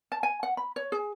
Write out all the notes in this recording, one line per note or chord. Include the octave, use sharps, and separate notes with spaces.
A5
G#5
F#5
B5
C#5
G#4